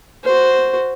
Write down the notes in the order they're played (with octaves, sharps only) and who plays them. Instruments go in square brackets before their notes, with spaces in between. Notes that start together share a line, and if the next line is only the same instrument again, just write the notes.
[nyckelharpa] F#4 C5